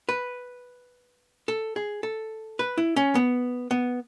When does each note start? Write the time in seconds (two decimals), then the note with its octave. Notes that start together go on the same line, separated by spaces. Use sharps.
0.09 B4
1.48 A4
1.76 G#4
2.03 A4
2.59 B4
2.78 E4
2.96 C#4
3.15 B3
3.71 B3